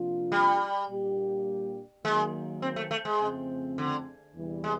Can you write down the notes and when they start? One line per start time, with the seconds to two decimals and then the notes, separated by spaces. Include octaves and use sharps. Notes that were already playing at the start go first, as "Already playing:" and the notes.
Already playing: C3 F3 A#3 D4 F4
0.32 G3
0.89 A#2 G3 A#3 D4 G4
2.05 D#3 F#3 G#3 A#3
2.62 C4
2.76 A3
2.91 A3
3.05 G#3
3.20 F2 C#3 F3 A3 C4
3.78 D3
4.35 E2 C3 E3 G3
4.64 G#3